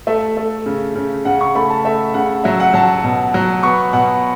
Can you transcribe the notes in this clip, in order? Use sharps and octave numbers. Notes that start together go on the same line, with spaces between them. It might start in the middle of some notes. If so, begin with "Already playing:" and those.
A3 E5
A3
C#3
C#3
C#3 F#5
C#6
A3 B5
A5
A3 E5
C#3 F#5
F#3 E5
F#5
F#3 A5
B2
F#3
B3 C#6
B2 F#5